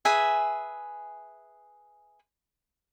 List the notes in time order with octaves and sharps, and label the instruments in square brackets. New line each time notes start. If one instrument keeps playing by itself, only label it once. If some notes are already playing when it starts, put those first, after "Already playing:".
[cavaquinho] G#4 B4 E5 G#5